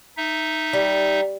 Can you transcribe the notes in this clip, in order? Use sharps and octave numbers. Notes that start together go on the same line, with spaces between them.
D#4 E5
G3